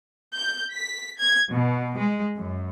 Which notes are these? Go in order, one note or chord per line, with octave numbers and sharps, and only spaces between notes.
G6
B6
G#6
B2
G#3
F#2